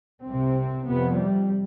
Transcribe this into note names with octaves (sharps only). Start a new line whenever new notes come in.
C2 C3 C4
F2 C3 B3
G3